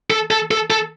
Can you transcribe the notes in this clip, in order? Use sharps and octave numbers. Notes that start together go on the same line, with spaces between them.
A4
A4
A4
A4